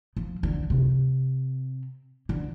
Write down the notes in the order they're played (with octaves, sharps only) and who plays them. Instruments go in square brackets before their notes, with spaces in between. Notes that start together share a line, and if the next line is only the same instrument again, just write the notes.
[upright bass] F3
D3
C3
D3